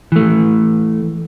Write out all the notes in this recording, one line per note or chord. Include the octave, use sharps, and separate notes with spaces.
E3 A3